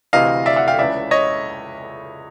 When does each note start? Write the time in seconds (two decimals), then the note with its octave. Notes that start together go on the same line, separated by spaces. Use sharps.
0.13 D2 C3 E3 D#5 F5
0.46 D5 E5
0.56 E5 F#5
0.68 F5 G5
0.79 C#2 C#3 E3 D5 E5
1.11 C#5 D#5